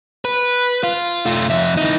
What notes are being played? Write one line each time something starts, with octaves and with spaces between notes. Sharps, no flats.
B4
F4
A3 F4
F2 E5
E3 D#4